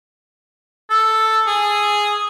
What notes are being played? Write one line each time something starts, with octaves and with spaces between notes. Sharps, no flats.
A4
G#4